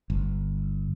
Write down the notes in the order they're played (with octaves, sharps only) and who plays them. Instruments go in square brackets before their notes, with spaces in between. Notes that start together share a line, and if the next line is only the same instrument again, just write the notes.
[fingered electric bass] G1